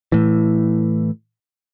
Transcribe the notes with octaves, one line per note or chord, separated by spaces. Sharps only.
A2 E3